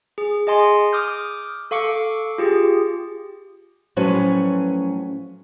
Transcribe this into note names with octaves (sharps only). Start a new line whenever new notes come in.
G#4
G#4 D#5 G#5 C6
D6 D#6 F6 G6
A4 F5 C#6 D6 C#7
F4 G4 G#4
A2 F3 F#3 C#4 B4 G#5